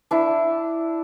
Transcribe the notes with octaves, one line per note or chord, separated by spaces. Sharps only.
D4 E4